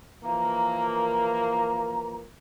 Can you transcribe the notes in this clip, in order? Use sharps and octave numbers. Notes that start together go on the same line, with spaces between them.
E3 F3 A#3 A#5